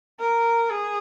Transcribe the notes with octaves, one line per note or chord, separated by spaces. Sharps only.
A#4
G#4